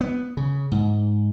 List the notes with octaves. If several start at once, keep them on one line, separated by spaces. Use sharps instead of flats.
B3
C#3
G#2